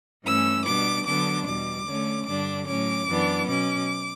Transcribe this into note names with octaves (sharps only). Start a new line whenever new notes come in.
G2 E3 A3 C#4 E6
B2 G3 B3 D4 D6
D3 F#3 B3 D4 D6
E2 B2 G3 D6
D3 A3 C#4
G2 D3 G3 D4 D6
A2 F#3 C#4 D6
F#2 E3 B3 D4
B2 F#3 C#4 D6